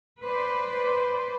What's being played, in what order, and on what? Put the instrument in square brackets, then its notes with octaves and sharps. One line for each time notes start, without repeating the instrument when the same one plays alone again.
[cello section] B4 C5 D5